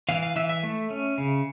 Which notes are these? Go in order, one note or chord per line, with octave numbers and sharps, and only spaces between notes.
E3 F5
F5
E3 E5
E5
A3
C#4
C#3